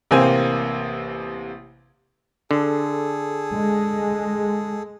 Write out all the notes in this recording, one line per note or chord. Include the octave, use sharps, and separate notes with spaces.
A1 C3 A#3 C4 C5 G#5
D3 G#4 A4
G#3